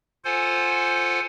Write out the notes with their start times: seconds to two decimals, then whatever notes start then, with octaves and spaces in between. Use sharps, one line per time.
0.25 F4 A4 C5 F#5 G#5